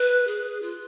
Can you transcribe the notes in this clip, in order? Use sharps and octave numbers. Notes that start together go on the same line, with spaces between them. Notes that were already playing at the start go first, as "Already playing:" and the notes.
Already playing: B4
G#4
F4